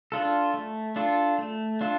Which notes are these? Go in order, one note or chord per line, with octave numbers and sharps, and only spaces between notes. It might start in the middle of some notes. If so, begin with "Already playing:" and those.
D4 F4 A4
A3
D4 F4 A4
A3
D4 F4 A4